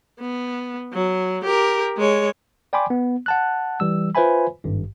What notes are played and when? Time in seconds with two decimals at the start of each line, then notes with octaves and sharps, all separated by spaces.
0.21 B3
0.93 F#3
1.45 G4 A#4
1.97 G#3 C#5
2.73 D5 G5 G#5 B5 C6 D6
2.90 B3
3.26 F#5 A5 F#6
3.80 E3 G3 E6
4.15 F4 B4 C5 E5 G#5 B5
4.64 G#1 G2